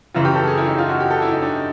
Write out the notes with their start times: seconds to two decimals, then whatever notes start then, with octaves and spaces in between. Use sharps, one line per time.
0.14 F#2 C#3 E3 F4
0.25 G4
0.36 A4
0.47 G#4
0.57 E4
0.68 D#4
0.78 F4
0.89 F#4
1.00 G4
1.11 A4
1.22 E4
1.32 D#4
1.42 D4